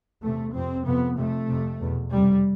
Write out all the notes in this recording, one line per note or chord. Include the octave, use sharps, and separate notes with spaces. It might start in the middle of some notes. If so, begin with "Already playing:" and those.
E2 C3 A3
F2 C3 C4
F2 C3 B3
F2 C3 A3
F2 C3
E2 B2
F2 C3 G3